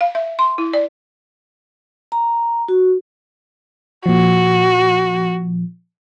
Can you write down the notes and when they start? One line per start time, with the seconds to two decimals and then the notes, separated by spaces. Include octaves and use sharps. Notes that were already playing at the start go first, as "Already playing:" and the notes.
0.01 F5
0.15 E5
0.39 C6
0.58 E4
0.73 D5
2.12 A#5
2.68 F#4
4.06 A#2 F3 F#4